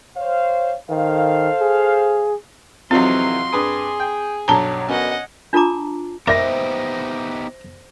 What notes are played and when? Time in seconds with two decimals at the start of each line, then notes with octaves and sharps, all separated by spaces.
0.17 C5 C#5 F5
0.90 D#3 A4 C5 F5
1.62 G#4
2.91 F2 C3 E3 F#3 C4 D#4 F4 C6
3.52 G2 G#4 B4 D#6
4.00 G5
4.48 B1 G2 F#3 C#5 A5 A#5
4.89 B2 D3 C#4 A#4 D#5 F#5
5.53 D4 F4 A4 A5 A#5 D6
6.27 B3 D#4 G4 A#4 C5 D5 E5 A#6